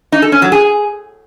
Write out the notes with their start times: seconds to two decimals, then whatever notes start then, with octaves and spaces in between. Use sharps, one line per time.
0.12 D#4
0.22 A4
0.32 C#4
0.42 F#3
0.52 G#4